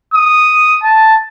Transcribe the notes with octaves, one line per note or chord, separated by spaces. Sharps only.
D#6
A5